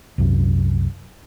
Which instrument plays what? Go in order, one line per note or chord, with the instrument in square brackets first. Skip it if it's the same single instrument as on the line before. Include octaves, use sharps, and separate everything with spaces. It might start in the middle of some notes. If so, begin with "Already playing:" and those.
[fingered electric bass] C2 F#2